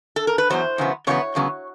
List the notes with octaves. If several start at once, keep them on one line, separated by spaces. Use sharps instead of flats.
A4
A#4
B4
E2 C#3 F#3 B3 C5
E2 C#3 F#3 B3
E2 C#3 F#3 B3 C#5
E2 C#3 F#3 B3